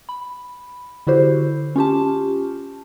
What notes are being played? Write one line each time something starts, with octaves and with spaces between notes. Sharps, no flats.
B5
D3 E4 F#4 G4 C5
C#4 F4 G4 A5